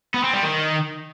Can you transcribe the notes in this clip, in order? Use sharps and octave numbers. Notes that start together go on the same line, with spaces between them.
B3
C4
G3
D#3